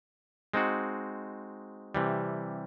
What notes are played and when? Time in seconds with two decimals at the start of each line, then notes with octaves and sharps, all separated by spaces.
0.54 G#3 C4 D#4 F#4
1.95 C3 E3 G3